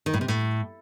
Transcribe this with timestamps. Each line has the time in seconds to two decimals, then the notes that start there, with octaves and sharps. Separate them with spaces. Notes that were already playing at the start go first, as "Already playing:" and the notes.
0.06 D#3
0.14 A2
0.21 C3
0.28 A2